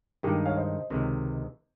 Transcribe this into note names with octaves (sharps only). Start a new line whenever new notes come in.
G2 D#3 G#3 D#4 G4 A#4
C#5 F5
C5 D#5
C#2 C3 D#3 G#3